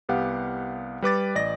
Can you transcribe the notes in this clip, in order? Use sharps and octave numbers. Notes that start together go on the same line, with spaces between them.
C2 B3 G4 F5 F#5
G3 B4 D6 A6
A1 D5 D#5 A#6